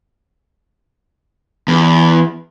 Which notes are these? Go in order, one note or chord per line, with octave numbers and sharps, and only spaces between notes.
E2